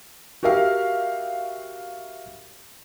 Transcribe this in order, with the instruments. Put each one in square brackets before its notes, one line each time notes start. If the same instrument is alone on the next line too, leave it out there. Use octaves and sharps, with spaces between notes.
[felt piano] F#4 G4 A#4 E5 F5